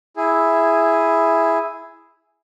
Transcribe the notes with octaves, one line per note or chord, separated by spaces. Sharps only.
E4 G#4